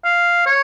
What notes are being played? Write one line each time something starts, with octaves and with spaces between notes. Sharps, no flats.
F5
C#5